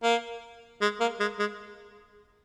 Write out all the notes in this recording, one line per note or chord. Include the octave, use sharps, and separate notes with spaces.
A#3
G#3
A#3
G#3
G#3